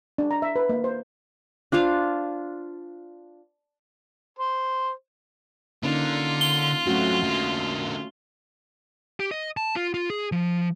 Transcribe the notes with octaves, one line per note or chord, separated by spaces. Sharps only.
D4
A#5
E5
B4
A#3
C5
D4 F4 C5 F5
C5
D3 A#3 C#4 D#4 F4
G7
F#3 A3 C4 C#4 F#4
D3 A#3
G4
D#5
A5
F4
F4
G#4
F3